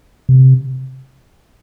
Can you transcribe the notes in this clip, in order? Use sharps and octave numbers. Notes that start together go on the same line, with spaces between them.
C3